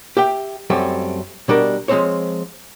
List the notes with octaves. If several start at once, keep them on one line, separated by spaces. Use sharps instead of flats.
G4 E5 G5
F#2 G3 A3 C4
B2 G3 D4 A#4
F3 G#3 A3 C4 C5 C#5